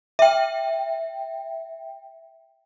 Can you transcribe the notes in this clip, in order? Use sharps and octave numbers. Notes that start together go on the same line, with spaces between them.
E5 G5